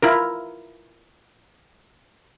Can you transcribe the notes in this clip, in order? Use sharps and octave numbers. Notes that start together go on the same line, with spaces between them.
E4 F4 A#4